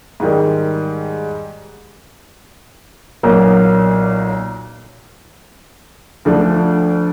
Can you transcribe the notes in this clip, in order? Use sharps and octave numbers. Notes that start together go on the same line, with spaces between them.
G#2 D#3 G3
B1 A#2 F#3 A#3
D2 D3 F3 A3 D4